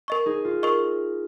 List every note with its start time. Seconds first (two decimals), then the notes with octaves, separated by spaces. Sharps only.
0.08 A#4 D#5 C#6
0.26 D#4 G#4
0.45 F4
0.63 A#4 D#5 C#6